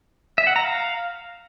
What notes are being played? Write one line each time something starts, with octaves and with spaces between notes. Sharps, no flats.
E5
F#5
A#5
F5